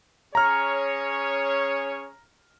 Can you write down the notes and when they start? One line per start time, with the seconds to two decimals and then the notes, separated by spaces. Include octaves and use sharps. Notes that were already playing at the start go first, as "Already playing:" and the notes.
0.35 C#4 G#4 C#5 A#5 F6